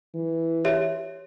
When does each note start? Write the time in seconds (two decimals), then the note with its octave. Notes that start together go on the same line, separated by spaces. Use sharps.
0.15 E3
0.65 G4 C#5 E5